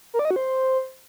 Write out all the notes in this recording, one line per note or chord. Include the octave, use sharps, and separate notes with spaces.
A#4
D5
D#5
F#4
C5